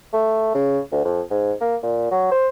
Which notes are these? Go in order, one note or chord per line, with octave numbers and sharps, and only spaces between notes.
A3
C#3
D2
F2
G#2
A#3
A#2
F#3
C5